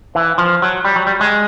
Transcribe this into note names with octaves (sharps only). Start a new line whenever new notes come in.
E3
F3
F#3
G3
F#3
G3
G#3